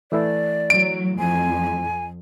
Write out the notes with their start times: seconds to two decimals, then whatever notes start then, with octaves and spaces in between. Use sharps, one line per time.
0.12 E3 A3 E4 D5
0.70 F#3 D7
1.19 F2 G#5